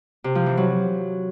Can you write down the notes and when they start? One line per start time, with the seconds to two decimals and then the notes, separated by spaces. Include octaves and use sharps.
0.24 C3
0.35 F3
0.46 E3
0.57 F#3